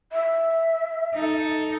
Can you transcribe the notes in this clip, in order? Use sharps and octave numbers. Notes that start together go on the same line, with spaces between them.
E5
D#4 A4